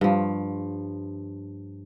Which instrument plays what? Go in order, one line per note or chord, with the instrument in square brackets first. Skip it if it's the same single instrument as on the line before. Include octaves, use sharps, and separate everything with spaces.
[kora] G2 F3